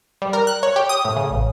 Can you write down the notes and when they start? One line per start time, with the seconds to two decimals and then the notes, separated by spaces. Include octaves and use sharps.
0.22 G3
0.33 A#4
0.47 F#6
0.63 C#5
0.76 G4
0.89 D#6
1.05 A2
1.16 C#3
1.30 A1